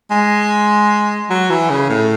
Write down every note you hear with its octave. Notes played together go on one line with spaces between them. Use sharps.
G#3
F#3
E3
C#3
A2